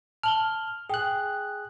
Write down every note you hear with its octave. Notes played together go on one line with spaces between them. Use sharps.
A5 F6 F#7 G7
G#4 G5 F#6